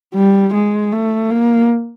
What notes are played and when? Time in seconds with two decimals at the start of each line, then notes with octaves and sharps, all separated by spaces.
0.15 G3
0.54 G#3
0.92 A3
1.30 A#3